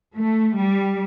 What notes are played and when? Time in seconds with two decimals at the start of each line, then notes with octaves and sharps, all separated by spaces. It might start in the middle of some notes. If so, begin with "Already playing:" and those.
0.17 A3
0.57 G3